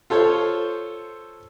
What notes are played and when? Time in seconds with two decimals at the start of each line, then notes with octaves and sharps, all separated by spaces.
0.10 F4 A4 C5 C#5